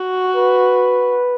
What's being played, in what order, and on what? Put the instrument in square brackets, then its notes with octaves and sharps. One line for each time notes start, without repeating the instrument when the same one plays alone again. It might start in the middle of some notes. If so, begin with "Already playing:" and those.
Already playing: [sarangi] F#4
[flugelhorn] B4